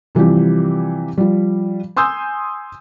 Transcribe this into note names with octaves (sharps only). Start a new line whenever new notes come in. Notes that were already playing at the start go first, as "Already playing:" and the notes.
C3 E3 F3 G3 G4
F3 G3
G#5 C6 D#6 E6 G6